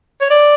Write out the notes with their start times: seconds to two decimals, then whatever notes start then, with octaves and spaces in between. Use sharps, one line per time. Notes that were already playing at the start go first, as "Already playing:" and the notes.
0.21 C#5
0.30 D5